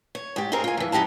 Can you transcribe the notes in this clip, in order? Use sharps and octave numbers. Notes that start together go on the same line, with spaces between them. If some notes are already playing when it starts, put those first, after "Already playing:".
C#5
G#2 G4
C4 D#4 G4 G#4 A#4
F4 G#5
F2 E3
F#2 D#4 G4 B4 A5